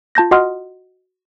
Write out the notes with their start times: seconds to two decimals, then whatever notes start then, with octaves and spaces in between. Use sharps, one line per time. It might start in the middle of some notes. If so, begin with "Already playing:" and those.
0.15 F4 A5 G6 A#6
0.31 F#4 D#5 F#5 C6 D#6 F6